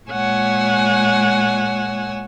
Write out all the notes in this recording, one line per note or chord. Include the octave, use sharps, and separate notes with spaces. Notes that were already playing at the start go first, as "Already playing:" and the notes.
A#2 G#3 C#5 F#5 G#5 E6